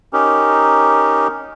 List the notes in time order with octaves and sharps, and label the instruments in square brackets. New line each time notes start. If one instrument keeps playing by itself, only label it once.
[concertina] C#4 D#4 G4 A#4